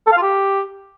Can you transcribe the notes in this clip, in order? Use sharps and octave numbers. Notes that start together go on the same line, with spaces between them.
A4
F5
F4
G4